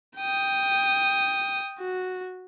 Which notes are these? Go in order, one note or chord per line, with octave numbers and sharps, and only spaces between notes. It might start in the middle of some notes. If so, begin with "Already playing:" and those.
G5 D#6
F#4